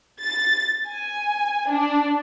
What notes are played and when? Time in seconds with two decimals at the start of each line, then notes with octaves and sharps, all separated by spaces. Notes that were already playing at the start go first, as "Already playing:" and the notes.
0.20 A6
0.87 G#5
1.70 D4